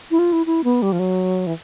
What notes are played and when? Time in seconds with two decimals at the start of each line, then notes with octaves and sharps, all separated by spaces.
0.11 E4
0.19 F4
0.33 E4
0.46 E4
0.64 B3
0.82 G3
0.92 F3
0.99 F#3
1.47 E3